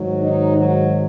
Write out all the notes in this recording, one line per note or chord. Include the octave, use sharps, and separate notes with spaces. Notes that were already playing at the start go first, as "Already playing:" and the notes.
Already playing: G#2 D#3 F#3
D#4
F#3 F#4